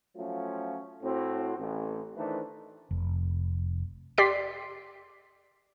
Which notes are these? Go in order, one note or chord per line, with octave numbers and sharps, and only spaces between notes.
F3 F#3 A3 C#4 F4
A2 C4 F#4
A1
D#3 E3 A3 D4 B4 C5
F1
G4 D5 C6 B6 C7